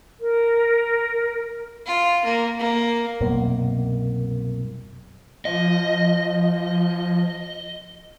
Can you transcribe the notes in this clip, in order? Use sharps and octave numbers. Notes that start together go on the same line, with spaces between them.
A#4
F4
A#3
A#3
C2 F#2 B2 A#3
F3 D#5